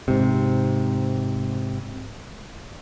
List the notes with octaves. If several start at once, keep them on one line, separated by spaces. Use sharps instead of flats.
G#2 C3